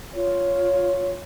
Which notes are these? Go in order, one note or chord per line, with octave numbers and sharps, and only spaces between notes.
F4 C#5